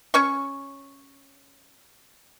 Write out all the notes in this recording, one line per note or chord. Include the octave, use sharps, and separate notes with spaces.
C#4 C#5 C#6